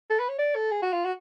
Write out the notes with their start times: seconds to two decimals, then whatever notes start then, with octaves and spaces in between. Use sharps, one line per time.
0.10 A4
0.19 B4
0.29 C#5
0.39 D5
0.55 A4
0.71 G#4
0.82 F#4
0.93 F4
1.05 F#4